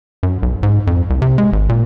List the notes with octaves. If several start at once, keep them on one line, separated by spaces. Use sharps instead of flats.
F#2
B1
G#2
F2
C2
C3
G#3
G#1
A#2